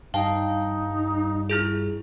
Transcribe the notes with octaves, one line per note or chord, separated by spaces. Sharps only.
G2 D#4 F5 G5 A5
E4 F4 G#4